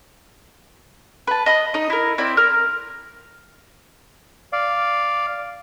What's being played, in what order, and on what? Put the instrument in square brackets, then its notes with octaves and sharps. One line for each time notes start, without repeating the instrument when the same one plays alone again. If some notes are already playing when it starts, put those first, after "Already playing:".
[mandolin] B4 A5
D#5 B5 D#6
D#4 D#5
E4 A#4
C4 E4 D5
A#4 F6
[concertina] D5 F5